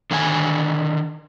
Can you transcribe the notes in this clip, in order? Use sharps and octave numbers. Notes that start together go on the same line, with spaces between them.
D3 D#3 E5 G#5